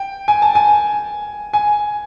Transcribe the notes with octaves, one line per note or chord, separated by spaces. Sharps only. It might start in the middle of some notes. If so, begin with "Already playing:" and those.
Already playing: G5
G#5
A5
G#5
G#5